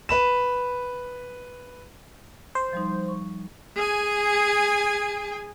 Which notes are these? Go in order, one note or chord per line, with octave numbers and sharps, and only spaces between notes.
B4 B5 E7
C5
F3 G3 D#4
C#6
G#4 G#5